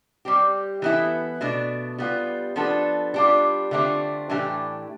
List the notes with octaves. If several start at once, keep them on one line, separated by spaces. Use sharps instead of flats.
G3 C4 G4
E3 B3 E4 A4
B2 A3 D4
G3 B3 F4
F3 B3 D4 A4
G3 D4 F4
D3 A3 C4 F4
A2 E3 A3 D4 G4